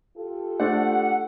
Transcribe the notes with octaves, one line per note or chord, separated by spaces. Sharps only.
F4 G4 A4
A3 D4 C5 F#5